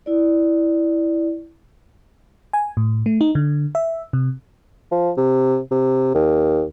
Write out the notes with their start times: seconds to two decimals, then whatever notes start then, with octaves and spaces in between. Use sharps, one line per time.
0.06 E4 D5
2.53 G#5
2.77 A2
3.06 A3
3.21 D#4
3.35 D3
3.75 E5
4.13 C3
4.91 F3
5.17 C3
5.71 C3
6.14 D#2